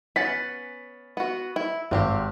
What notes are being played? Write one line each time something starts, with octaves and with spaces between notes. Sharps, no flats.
B3 C#4 F#5 A6 B6
B3 F#4
E4
G#1 G3 C4 G4